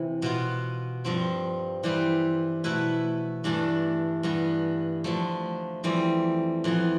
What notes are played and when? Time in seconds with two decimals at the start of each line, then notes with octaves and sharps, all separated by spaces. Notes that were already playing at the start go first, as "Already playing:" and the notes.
Already playing: C3 E3
0.22 B2 B3 F4
1.05 G2 F3 C4
1.84 E3 G3 C4 G4 B4
2.64 B2 A3 E4 B4
3.44 G2 E3 A3 D4 A4
4.23 G2 E3 B3
5.04 D3 F3 A3
5.84 F2 E3 G3 C4
6.64 F2 E3 B3